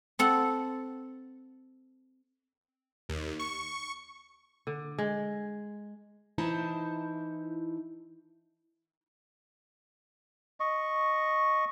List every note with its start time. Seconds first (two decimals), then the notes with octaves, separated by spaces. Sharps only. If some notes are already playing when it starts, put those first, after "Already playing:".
0.19 C4 A4 F#5
3.09 D#2
3.39 C#6
4.67 D3
4.98 G#3
6.38 E3 D#4 E4 C5 A5
10.60 D#5 C#6